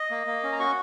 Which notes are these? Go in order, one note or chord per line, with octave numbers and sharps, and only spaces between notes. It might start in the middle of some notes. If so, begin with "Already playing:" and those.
Already playing: D#5
A#3
A#3
C#4
A#5
F#4 C#6